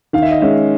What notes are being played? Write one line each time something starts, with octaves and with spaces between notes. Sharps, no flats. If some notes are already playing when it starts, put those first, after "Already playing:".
D#3 F5
E5
D#5
G#3 C#4 E5